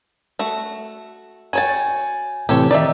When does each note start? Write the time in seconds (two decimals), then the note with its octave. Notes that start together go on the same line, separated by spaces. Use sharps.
0.39 A3 F#4
1.53 F#4 C#5 G5 G#5 A6
2.49 A2 C3 E3 G4 A4 C#5
2.71 D#3 D#4 D5 E5